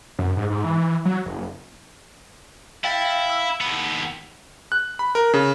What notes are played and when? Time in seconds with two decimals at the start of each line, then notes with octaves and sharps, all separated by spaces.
0.19 F#2
0.37 G#2
0.50 G#2
0.64 E3
0.77 E3
1.05 F#3
1.26 F#1
2.84 E4 F5 G5 A6
3.05 F5
3.30 E6
3.61 D#2 B3
4.72 F#6
4.99 B5
5.15 A#4
5.34 C#3